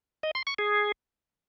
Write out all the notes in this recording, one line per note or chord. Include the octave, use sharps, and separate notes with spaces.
D#5
C6
C#6
G#4